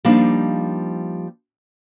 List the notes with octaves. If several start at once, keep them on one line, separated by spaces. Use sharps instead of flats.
F3 G3 A#3 D4 D#4